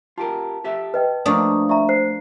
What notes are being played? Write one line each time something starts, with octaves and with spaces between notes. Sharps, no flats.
F4 G4 A#4 A5
G4 A4 E5
B4 D#5 G5
F3 A3 A#3 D4 A#5 C#6 D#6
E4 D5 E5 A#5 C#6
C5 C7